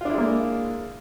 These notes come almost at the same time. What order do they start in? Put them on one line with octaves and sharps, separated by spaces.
F4 D4 E4 G#3 A#3